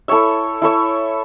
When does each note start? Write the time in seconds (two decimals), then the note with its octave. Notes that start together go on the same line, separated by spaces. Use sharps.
0.08 E4 A4 C#5 E5
0.62 E4 A4 C#5 E5